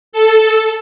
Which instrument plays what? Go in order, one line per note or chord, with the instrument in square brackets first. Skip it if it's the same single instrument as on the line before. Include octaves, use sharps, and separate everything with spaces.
[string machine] A4